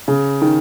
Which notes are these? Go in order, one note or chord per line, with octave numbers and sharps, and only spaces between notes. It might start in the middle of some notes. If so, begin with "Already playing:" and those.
C#3
D#3